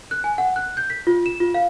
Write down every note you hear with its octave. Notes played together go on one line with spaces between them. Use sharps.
F#6
G#5
F#5
F#6
G6
B6
F4
E7
F4
F5